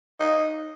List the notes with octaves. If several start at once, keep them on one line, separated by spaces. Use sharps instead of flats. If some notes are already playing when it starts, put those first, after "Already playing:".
D#4